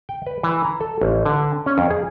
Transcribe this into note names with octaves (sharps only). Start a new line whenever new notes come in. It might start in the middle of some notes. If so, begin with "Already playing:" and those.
G5
B4
E3
A#5
A4
A1
D3
C#4
F2
G#4